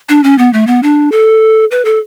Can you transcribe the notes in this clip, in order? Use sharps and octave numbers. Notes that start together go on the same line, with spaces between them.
D4
C#4
B3
A3
B3
D4
A4
B4
A4